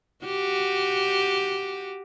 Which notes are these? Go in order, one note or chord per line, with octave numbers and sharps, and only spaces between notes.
F#4 G4